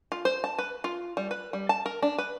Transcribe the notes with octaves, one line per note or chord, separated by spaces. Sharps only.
F4
C5
A5
B4
F4
G3
B4
G3
A5
A#4
D4
B4